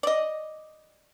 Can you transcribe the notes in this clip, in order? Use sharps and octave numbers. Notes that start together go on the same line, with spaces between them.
D5 D#5